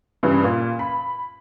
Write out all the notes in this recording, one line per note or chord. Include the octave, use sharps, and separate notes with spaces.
G2 C#3 E3
A#2
B5